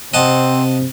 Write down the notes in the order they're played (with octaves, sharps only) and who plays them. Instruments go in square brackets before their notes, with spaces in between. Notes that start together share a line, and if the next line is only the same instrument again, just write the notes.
[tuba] C3 [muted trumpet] C4 [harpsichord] D#5 F#5 A5